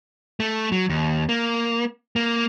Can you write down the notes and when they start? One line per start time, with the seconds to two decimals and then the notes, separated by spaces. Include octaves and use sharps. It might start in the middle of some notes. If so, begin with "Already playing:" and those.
0.40 A3
0.72 F#3
0.90 D#2
1.29 A#3
2.16 A#3